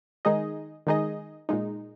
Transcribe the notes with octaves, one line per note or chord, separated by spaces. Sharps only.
D#3 G#3 D#4 G#4 D#5
D#3 G#3 D#4 G#4 D#5
A#2 G#3 D#4